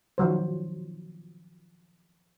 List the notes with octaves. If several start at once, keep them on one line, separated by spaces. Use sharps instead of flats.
D#3 F3 F#3 C5